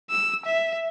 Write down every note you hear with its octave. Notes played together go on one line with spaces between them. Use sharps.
E6
E5